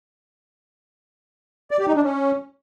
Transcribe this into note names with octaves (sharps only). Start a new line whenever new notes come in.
D5
G4
D#4
D4
C#4